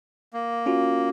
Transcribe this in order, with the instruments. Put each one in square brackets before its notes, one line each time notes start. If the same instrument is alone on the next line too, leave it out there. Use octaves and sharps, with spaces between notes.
[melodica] A#3
[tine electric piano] C#4 F4 F#4